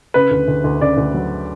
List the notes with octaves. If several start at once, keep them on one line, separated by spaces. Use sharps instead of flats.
C#3 B4
D2
D2
D2
C#3 D5
D2
F#3